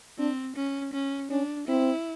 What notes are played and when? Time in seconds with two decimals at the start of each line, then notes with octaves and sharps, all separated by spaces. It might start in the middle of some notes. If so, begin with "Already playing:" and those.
0.18 C4 D4
0.56 C#4
0.93 C#4
1.30 C#4 D4
1.67 C4 E4